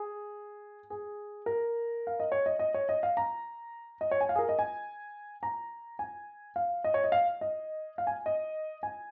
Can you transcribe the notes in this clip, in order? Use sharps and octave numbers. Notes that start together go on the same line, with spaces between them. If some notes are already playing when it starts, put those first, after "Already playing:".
Already playing: G#4
G#4
A#4
F5
D#5
C#5
D#5
D#5
C#5
D#5
F5
A#5
D#5
C#5
G#5
F5
G#4
A#4
D#5
G#5
A#5
G#5
F5
D#5
C#5
D#5
F5
D#5
F5
G#5
D#5
G#5